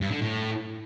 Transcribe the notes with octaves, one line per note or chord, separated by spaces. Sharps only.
G2
D3
A2